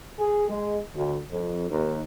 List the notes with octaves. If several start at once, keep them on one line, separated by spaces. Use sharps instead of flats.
G#4
G#3
D2
F2
D#2